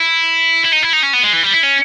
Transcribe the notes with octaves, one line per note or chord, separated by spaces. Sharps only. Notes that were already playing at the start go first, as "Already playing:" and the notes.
Already playing: E4
E4
D#4
E4
D#4
C#4
B3
G#3
E3
G3
E4
C#4